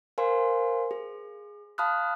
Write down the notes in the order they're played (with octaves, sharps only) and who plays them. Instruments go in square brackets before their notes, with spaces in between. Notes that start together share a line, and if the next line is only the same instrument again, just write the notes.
[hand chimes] A#4 C5 F5 G#5 C6
G#4
F5 A5 B5 D#6 F6 F#6